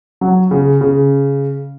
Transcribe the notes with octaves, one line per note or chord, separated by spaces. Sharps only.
F#3
C#3
C#3